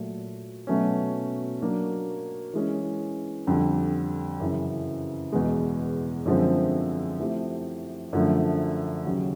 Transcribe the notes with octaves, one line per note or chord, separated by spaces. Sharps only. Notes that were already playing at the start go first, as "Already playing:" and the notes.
Already playing: A#2 F#3 A3
B2 F#3 A3 C#4
F#3 A#3 D4
E3 G#3 C#4
F2 D3 G3
F#2 C#3 E3
E2 B2 G#3
F#2 D3 F3 G#3 C4
F3 A3 C4 E4 G4
F#2 D3 F3 A3
D#2 C#3 F#3